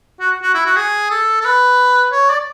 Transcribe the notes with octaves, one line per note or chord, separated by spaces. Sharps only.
F#4
F#4
E4
F#4
G#4
A4
A4
B4
C#5
D5